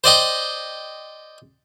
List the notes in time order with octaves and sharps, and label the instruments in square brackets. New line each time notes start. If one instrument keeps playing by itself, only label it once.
[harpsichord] C5 D5 D#5 G5